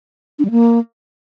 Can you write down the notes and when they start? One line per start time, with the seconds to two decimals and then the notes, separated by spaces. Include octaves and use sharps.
0.39 D4
0.45 G3
0.51 A#3